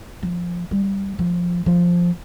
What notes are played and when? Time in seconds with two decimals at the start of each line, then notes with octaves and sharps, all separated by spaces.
0.23 F3
0.71 G3
1.19 F3
1.66 F3